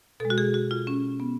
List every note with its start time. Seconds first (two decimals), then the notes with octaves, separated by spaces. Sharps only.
0.20 B2 A4
0.25 G#3
0.30 F#4
0.38 G#4
0.54 F#4
0.71 F4
0.87 C#4
1.20 B3